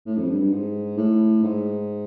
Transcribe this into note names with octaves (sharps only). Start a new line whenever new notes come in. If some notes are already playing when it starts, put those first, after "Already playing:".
A2
F2
G2
G2
G#2
A2
G#2